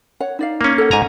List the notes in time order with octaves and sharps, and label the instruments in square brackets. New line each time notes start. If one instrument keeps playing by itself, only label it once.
[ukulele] C#5 F#5
D#4 D5 F5
[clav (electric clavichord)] A#3 C#4
[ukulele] A4 F#5
[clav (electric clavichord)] G#2 G#5 A#5